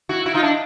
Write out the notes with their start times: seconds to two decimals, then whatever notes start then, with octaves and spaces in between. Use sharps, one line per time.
0.09 E4 F#4
0.26 E4 F#4
0.34 D#4 F4
0.43 D4 E4